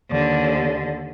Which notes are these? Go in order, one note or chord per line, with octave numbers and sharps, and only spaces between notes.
D#2 D3